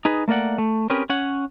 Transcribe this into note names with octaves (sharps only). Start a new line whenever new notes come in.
D#4 G#4 B4
A3 A#3 A#4 D5 F#5
A3
C4 C#4 G4 G#4 A#4 B4
C#4 C#5 F#5